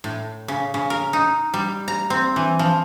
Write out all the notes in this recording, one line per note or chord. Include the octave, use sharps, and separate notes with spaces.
A2
C#3
C#3
A#4
D#4
G3
A#5
C4
E3
F3